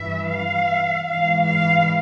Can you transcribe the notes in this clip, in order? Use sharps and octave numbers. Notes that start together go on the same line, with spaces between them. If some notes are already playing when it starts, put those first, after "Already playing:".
Already playing: G2 E3 E5
F5
G#2 E3 F5
F5